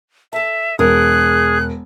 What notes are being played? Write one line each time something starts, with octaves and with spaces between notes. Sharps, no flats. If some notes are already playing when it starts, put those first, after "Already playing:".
A4 E5 A5
E1 G#4 A#4 F#6